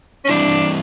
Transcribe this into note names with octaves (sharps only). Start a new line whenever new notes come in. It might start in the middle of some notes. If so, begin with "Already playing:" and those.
C#4
E3 G3 C4 D4 E4